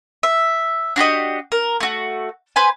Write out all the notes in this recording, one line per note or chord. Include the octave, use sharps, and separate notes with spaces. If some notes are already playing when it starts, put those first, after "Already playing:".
E5
D4 F#4 G4 D#5
A#4
A3 F#4
B4 C5 G#5